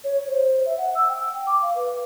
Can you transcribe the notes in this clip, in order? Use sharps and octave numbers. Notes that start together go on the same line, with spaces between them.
C#5
C5
E5
F#5
E6
G5
D6
F5
B4